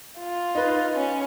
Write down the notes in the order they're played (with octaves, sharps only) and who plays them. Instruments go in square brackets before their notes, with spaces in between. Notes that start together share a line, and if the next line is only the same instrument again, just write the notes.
[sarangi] F4
[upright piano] D#4 B4
[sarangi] C#4